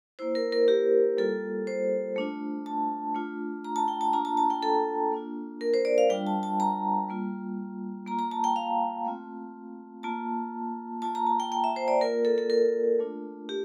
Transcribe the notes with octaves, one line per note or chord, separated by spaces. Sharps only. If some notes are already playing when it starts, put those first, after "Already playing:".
A#3 E4 C5
A#4
A#4
G4
G3 A#3 F4 A4
C5
A3 D4 F4
A5
A3 D4 F4
A#5
A5
G5
A5
A#3 D4 F4 A#5
A5
A5
G5
A4
A#3 D4 F4
A#4
C5
D5
F5
G3 D4 F4 G5
A5
A5
A#5
G3 A#3 F4
A#3 F4 A#5
A#5
A5
G5
F5
A3 C4 F4
A#3 F4 A5
A#3 F4 A5
A#5
A5
G5
G5
E5
C5
D5
A#3 F4 A#4
A4
A4
A#4
A3 D4 F4
G4